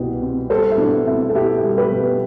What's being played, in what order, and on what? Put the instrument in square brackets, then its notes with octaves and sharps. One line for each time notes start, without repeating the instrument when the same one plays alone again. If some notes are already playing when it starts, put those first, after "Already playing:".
Already playing: [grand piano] C2 B2 G3 G4
C4
G3 A4 C5
E4
B2 D4
C4 E4
A4
B2 E4 G4
G3
G4 B4
B2